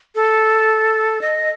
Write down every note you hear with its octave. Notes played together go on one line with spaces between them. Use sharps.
A4
D#5